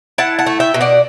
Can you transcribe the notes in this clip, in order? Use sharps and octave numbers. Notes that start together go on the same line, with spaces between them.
E4 F#5 A5
F#5 A5
A3
E5 G5
B2
D5 F#5